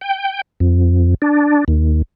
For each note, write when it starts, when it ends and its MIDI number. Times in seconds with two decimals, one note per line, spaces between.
0.01 0.41 79
0.60 1.14 41
1.22 1.64 62
1.68 2.02 39